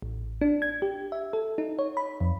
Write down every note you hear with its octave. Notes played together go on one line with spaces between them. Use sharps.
A1
D4
G#6
G4
E5
A4
D#4
C#5
B5
F2